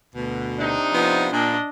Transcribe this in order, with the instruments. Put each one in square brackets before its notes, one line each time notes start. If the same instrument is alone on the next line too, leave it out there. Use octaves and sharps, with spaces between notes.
[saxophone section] D2 B2
[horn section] C3 D4 D#4
[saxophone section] F3 B3
[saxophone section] A#2 [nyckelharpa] D4 D#5